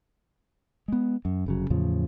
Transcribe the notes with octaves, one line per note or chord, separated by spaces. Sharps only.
G#3 B3
F#2
F1 C#3 F#3
E2 A2 C#3 F3